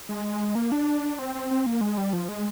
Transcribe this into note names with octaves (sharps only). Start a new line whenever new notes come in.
G#3
A#3
D4
C4
C4
C4
A#3
G#3
G3
F3
G#3